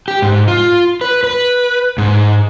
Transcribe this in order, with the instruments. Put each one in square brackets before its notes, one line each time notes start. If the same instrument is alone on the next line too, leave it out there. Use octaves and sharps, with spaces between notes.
[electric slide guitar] G4
G#2
F4
B4
B4
G#2